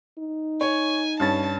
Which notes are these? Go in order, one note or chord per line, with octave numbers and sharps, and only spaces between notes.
D#4
C#5 G#5
G2 C#4 A5 A6